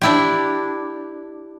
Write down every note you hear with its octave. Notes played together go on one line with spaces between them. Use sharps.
D4 E4 G4